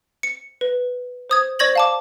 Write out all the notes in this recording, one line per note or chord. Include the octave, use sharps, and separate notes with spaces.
C#7
B4
C5 D#6 G#6
C5 D5 C#6 G#6 A#6 F#7
F5 A5 D6